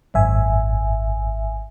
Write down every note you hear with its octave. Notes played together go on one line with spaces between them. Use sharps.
G#1 F#2 E5 G#5